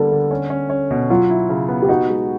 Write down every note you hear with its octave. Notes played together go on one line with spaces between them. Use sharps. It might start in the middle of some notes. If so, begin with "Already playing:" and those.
Already playing: D3 G3 A#3 B3 A4
D3
C#4
C#4
C#4
B2
F#3 F4
E4
C#3
B3
G4
D#4 F#4
G#3